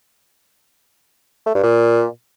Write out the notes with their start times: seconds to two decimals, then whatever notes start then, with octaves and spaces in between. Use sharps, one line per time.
1.46 A3
1.55 G2
1.63 A#2